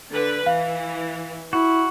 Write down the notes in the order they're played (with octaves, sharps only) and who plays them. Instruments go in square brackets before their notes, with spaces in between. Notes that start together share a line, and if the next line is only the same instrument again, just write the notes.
[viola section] D3 B4
[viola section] E3 [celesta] F5
[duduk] E4 [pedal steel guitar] F#4